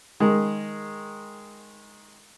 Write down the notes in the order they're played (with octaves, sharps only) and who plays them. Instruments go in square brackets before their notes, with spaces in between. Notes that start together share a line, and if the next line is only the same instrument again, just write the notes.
[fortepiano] D#3 G#3